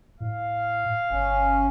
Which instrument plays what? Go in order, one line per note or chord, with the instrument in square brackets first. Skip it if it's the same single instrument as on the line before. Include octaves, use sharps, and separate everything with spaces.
[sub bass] A2 [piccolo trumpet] F5
[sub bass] G1 [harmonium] C#4